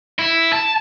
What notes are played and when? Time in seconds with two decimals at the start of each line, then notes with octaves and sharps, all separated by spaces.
0.19 E4
0.53 A5